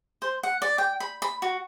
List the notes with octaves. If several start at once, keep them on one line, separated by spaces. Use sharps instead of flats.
C5
F#5
D5
G5
B5
B5
F#4